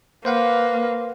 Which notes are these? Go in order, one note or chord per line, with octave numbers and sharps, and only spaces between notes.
A#3 B4 C5 F5 F#5